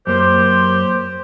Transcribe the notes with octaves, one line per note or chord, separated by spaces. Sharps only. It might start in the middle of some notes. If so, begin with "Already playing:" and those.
F#2 A#3 G4 C5